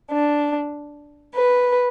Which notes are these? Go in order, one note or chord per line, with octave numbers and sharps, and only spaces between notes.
D4
B4